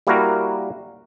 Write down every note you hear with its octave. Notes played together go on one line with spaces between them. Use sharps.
G3 A#3 E4 F#4 A#4